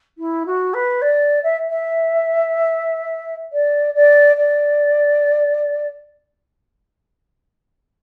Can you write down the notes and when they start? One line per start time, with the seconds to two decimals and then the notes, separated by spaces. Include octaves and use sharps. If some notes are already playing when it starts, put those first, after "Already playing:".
0.18 E4
0.45 F#4
0.73 B4
1.01 D5
1.43 E5
1.68 E5
3.52 D5
3.94 D5
4.36 D5